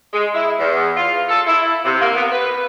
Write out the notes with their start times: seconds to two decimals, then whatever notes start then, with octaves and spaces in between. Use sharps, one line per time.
0.12 G#3
0.34 E4
0.59 E2
0.96 F4
1.29 A4
1.46 E4
1.84 C3
2.00 A#3
2.16 B3
2.31 B4